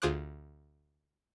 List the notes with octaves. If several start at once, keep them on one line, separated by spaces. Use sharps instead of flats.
D2 F4 G#4 C5 D6 F#6